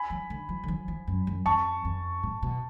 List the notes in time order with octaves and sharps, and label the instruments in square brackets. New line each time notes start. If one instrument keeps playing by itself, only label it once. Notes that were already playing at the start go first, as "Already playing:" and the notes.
Already playing: [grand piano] G#5 B5
[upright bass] F3
D3
F3
D3
F3
F3
F#2
F#2
[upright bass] F2 [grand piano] A5 C#6
[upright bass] F2
A2
B2